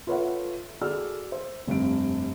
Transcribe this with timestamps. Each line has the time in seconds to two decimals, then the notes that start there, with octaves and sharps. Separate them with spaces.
0.07 F4 A4 B4 C#5 E5 F#5
0.81 F#4 G#4 A4 D5 E6 F6
1.32 C5
1.67 F1 G2 C4 D7